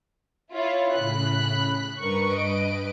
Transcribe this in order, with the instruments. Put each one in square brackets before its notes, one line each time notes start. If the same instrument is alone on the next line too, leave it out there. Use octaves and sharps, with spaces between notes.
[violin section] E4 F4 C#5
[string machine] A2 C#3 [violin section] B5 F#6
[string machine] G2 B4 [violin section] A#4 C#6
[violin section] D#5 D7